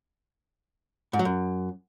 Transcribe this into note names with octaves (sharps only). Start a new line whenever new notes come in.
G#2
F#3
F#2